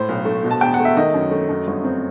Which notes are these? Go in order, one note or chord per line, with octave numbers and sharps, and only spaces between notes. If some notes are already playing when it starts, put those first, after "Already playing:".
Already playing: A2 C5
B1
A3
B2
A5
E2 G5
F#5
A3
E5
D#3 D#5
F#2
A3
F#2
G1
C4